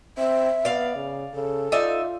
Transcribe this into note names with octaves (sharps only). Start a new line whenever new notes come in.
C4 E5
B3 D5 F5
C#3
C#3 A4
D#4 F4 D5 E5